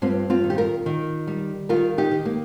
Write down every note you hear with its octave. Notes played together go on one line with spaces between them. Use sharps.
G2 C4 F4
C4 F4
D#3
G4
F4 A#4
D#3
G3
D#3 F4 A#4
D#4 G4
D#3
A#3